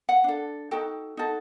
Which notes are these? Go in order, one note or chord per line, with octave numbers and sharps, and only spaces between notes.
F#5
D4 A4
D#4 F#4 A4 G5
D#4 F#4 A4